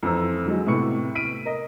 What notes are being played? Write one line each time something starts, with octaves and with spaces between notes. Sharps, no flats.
F2 E3 C5 A#5 E6
D3 F#3 G#3
A2 C3 B3 C#6 C#7
F6 B6 D7 D#7
A#4 D#5